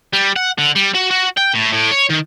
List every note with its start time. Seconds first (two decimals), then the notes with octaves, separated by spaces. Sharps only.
0.13 G3
0.36 F#5
0.58 D3
0.76 G3
0.95 F#4
1.11 F#4
1.37 G5
1.54 A2
1.72 A2
1.91 C#5
2.10 D#3